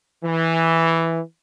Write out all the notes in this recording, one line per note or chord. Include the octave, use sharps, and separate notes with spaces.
E3